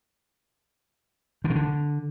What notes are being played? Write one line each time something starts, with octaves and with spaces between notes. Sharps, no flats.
D3
B2
D3